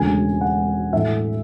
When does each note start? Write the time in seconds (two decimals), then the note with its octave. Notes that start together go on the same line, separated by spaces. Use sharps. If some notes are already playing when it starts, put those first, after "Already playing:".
Already playing: E1 D2 C#3 G#3 G#5
0.41 F#5
0.93 A2 E3 A3 E4 E5